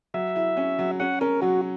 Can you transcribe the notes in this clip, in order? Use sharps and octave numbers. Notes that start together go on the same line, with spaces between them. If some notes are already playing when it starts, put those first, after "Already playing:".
F#3 E5
E4
C#4
F#3
C#4 F#5
C#4 A#4
F#3 F#4